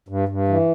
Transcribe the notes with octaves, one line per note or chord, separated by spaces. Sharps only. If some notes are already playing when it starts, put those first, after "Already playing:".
G2
G2
E3